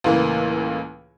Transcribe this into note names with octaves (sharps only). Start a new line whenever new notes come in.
C#2 A2 E3 A#3